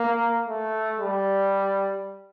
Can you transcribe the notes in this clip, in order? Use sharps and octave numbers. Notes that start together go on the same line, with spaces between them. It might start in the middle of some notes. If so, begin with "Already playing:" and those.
Already playing: A#3
A3
G3